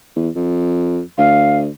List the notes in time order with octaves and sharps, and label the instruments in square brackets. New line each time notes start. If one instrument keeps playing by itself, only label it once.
[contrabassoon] E2
F2
[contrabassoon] D2 [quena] F5